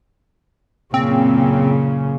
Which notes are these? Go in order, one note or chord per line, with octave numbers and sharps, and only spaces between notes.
F#2 A#2 C#3 C4